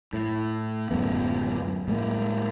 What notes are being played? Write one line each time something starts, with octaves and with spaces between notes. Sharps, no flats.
A2
D1 F#2 G#3 B3
A2 G#3 A#3